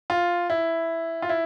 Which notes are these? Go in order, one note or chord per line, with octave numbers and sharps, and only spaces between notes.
F4
E4
F4
E4